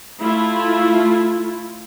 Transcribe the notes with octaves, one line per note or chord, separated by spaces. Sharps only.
A3 E4 F4